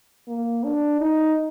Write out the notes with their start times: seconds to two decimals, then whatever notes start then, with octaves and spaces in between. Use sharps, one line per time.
0.28 A#3
0.64 D4
1.01 D#4